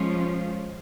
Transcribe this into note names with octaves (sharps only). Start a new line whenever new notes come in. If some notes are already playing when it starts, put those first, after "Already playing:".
Already playing: F3 G#3 C#4 F4